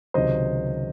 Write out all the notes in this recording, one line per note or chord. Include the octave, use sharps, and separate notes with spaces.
C#2 C3 D#3 F#3 C5 D#5